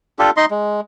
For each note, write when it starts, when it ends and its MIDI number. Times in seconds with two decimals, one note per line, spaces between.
0.19 0.30 62
0.19 0.30 65
0.19 0.30 67
0.19 0.30 69
0.37 0.45 63
0.37 0.45 75
0.37 0.45 84
0.51 0.81 56